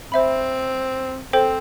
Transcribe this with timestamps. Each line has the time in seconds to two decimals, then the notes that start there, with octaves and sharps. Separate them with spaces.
0.12 C4 C5 E5 B5
1.33 C4 A4 C5 G5